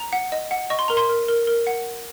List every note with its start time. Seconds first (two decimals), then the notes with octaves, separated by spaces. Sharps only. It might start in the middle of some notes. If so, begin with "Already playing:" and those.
Already playing: A#5
0.13 F#5
0.32 D#5
0.51 F#5
0.70 D#5 C#6
0.79 C6
0.88 A#4 A#5
0.97 C6
1.09 A#4
1.28 A#4
1.47 A#4
1.67 F#5